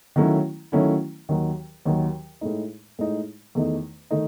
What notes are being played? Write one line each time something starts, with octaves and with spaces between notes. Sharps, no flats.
D#3 F#3 A3 C#4 E4
D#3 F#3 A3 C#4 E4
D#2 D#3 F#3
D#2 D#3 F#3
A2 G#3 D#4
A2 G#3 D#4
E2 D#3 A3 D#4
D#3 A3 D#4